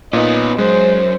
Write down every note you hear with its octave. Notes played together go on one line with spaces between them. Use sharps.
A#2 B3 C#4 D#4
F#2 G#3 C5